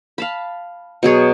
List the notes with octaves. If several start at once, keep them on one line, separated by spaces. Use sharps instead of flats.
F5 A5 B5
B2 F#3 G#4 C#5